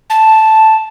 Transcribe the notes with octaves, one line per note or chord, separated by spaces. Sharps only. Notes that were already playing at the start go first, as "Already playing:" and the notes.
A5